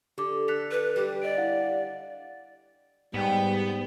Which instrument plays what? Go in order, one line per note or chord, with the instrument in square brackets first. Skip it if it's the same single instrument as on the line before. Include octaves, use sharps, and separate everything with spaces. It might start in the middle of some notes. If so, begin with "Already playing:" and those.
[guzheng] D3 [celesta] G4 D6
[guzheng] A4 [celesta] F#6 B6 F7
[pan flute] B4
[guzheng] G3 [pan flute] G4
[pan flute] D5 [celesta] D#5 D7
[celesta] E4 F5 F#5
[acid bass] G#2 [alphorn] G3 [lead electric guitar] B3 [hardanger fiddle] G5